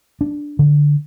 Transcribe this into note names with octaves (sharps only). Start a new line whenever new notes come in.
D4
D3